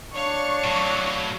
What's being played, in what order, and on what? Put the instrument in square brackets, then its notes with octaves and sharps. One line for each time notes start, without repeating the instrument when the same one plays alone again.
[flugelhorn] D4 [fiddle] C#5 F5 [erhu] C#6
[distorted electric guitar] A2 F#3